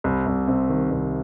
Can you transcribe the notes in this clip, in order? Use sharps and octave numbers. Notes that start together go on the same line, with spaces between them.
C2
C2
C3
D#3
C2